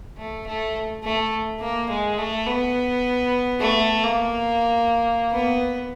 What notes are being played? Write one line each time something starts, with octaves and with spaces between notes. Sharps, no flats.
A3
A3
A3
A#3
G#3
A3
B3
A3
A#3
B3